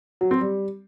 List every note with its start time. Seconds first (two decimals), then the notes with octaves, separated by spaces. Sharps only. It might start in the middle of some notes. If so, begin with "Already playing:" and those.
0.21 F#3
0.31 C4
0.41 G3